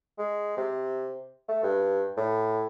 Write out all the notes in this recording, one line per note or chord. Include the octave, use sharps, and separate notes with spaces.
G#3
C3
A3
G2
A2